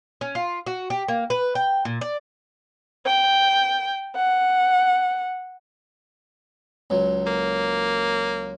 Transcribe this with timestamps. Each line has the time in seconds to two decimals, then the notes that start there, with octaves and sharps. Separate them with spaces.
0.21 C#4
0.35 F4
0.66 F#4
0.90 G4
1.08 A#3
1.30 B4
1.55 G5
1.85 A#2
2.01 D5
3.06 G5
4.17 F#5
6.90 C#2 F#3
7.27 A#3